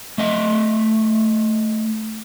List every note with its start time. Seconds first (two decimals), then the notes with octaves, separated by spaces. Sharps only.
0.18 A3 D#5 E5